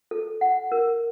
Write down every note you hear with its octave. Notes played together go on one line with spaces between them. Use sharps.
A4
F#5
A#4